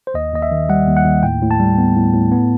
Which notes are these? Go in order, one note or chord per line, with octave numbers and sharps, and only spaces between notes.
C5
D#2 D#5
D#2 D#5
E5
D#3
G3 F#5
D#2
F#5
D#2
A2 G5
A2
A5
G3
B3
A2
A2
B3